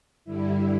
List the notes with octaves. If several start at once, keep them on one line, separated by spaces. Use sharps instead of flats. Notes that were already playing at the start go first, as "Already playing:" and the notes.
G2 D3 G3 E4